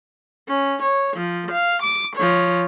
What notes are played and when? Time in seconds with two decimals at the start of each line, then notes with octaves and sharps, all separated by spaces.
0.48 C#4
0.82 C#5
1.16 F3
1.51 F5
1.82 D6
2.16 F3 C#5